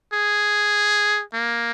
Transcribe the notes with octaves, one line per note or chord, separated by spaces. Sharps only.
G#4
A#3